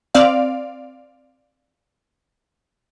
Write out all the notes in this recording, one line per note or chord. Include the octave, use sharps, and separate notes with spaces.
C4 D5 F5